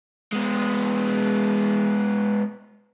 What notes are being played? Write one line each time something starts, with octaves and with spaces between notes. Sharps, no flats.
G#3 B3